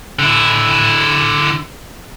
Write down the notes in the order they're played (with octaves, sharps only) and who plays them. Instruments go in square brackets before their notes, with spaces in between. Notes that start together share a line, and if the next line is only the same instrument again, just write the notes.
[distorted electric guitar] D3 E4